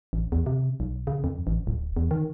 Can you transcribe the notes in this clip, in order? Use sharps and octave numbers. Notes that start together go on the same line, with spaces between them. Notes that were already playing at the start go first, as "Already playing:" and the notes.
A1
E2
C3
B1
C#3
F2
A1
D1
E2
D#3